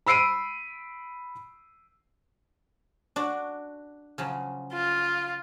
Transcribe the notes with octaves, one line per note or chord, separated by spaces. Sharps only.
B5 E6 C7 D7 D#7
D4 F#4 D5
C#3 F3 F#3
F4